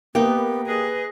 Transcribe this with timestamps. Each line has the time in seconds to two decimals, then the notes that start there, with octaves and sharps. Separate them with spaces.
0.15 A#3 B3 D#4 G4
0.66 G#4 B4 D#5